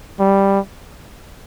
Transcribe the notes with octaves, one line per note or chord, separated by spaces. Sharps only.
G3